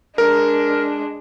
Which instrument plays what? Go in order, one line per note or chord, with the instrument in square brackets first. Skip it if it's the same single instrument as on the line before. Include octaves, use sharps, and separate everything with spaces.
[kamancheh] G#3 D4 [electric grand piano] A#4